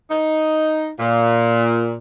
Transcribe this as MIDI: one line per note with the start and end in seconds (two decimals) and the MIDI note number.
0.10 0.89 63
0.99 1.94 46